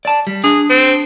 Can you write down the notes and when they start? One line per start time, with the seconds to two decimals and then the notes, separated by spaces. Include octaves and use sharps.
0.05 D5 A5
0.27 G3
0.44 D4 G#4
0.70 C4